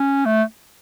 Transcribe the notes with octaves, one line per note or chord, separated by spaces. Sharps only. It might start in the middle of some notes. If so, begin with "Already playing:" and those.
Already playing: C#4
A3